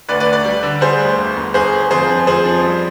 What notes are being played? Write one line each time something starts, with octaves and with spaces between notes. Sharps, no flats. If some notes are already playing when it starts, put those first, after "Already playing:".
D2 B4 D5
B4 D5
D2
B4 D5
G3
D3
G3 G#4 C5
D2
G1
G1
G1 G#4 C5
G1
F2 G#4 C5
F3
F2 G#4 C5
F3
G3